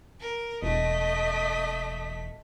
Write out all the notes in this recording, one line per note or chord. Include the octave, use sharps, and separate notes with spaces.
A#4
E1 A3 D#5 B6